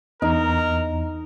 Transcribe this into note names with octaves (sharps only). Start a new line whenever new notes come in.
E2 D#4 A#4